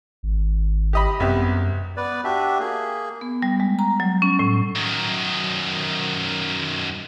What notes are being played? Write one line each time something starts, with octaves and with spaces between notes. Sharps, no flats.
G#1
G4 D#5 B5
C2 F#2 B3 G4
B3 B4 D5
D4 F#4 G4 E5
A#3 G#4
B3
G3
G#3
A#5
F#3
C#4
A2
F#2 D#3